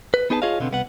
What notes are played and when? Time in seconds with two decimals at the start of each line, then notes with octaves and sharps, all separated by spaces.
0.14 B4
0.30 B3 D#4 G#4 B4 G#5 A5
0.42 F4 G#4 C#5 D#5 F5
0.60 B2 D3 B3 C4
0.71 C2 B3 F#5